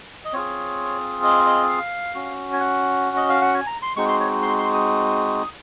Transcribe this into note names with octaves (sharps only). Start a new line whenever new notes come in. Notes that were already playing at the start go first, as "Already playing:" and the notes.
D#5
C4 F4 G#4 C#5
D#5
D#5
F5
C#4 F#4
G#5
F#5
D#5
F5
F#5
G#5
A#5
C6
G#3 C4 D#4 F#4 C#6
C6
C#5
C6
C6
D#6